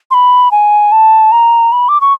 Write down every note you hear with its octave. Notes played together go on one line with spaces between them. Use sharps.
C6
B5
G#5
A5
A#5
B5
D6
C#6